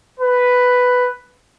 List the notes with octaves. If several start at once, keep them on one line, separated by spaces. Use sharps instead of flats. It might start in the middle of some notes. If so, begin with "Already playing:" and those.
B4